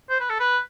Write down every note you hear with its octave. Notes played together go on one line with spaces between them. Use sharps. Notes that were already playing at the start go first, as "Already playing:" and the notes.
C5
B4
A4
B4